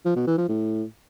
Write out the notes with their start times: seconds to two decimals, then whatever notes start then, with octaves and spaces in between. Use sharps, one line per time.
0.05 F3
0.16 B2
0.27 E3
0.38 F3
0.49 A2